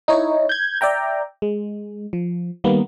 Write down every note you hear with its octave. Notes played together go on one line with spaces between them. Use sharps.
D#4 E4 C#5
G6 G#6
D5 E5 G5 A#5
G#3
F3
D#3 G3 A#3 B3